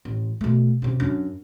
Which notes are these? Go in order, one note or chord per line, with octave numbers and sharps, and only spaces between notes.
A1
B2 A3
F#2 C3
F#2 D4